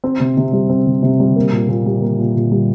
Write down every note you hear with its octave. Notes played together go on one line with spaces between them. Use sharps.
C4
C3
C3
G3
C4
C3
C3
G3
A#3
A#2
A#2
G3
A#3
A#2
A#2
G3